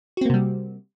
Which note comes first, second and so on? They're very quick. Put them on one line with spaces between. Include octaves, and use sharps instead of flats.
F#4 C4 A#3 C3 G3